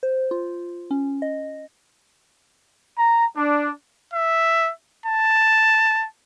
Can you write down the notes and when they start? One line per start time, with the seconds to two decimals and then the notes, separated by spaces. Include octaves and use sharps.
0.03 C5
0.31 F4
0.91 C#4
1.22 D#5
2.99 A#5
3.36 D4
4.13 E5
5.06 A5